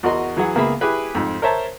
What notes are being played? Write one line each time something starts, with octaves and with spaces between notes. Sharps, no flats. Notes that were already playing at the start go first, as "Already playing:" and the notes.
E2 F#4 A#4 D#5 C6
E3 F#3 G#4 F#5
C#2 A#3 B3 G#4 E5 B5
E4 G4 G#4 B4
F2 G#2
A#4 C5 C#5 E5 A5 A#5